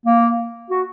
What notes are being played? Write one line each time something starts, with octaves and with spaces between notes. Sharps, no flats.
A#3
F#4